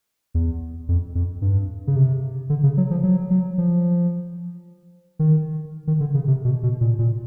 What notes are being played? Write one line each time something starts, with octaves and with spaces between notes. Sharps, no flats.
E2
F2
F2
G2
C#3
C3
D3
C#3
F#3
F3
F#3
F#3
F3
D#3
D#3
D3
C#3
C3
B2
B2
A#2
A#2